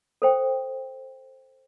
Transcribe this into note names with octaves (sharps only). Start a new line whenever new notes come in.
A4 C5 G5